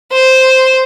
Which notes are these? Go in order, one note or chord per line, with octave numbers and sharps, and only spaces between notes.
C5